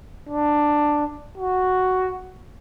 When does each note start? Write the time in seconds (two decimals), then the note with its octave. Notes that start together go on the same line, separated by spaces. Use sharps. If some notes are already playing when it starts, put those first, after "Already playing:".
0.29 D4
1.38 F#4